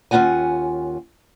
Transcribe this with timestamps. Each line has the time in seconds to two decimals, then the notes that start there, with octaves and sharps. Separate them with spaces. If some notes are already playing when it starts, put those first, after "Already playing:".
0.11 D#2 C#4 D#4 F4 F#5 G#5